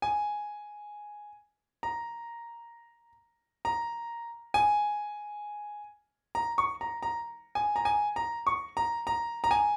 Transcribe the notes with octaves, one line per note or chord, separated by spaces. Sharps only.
G#5
A#5
A#5
G#5
A#5
C#6
A#5
A#5
G#5
A#5
G#5
A#5
C#6
A#5
A#5
A#5
G#5